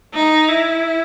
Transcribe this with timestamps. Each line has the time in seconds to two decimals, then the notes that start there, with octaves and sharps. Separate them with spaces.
0.14 D#4
0.49 E4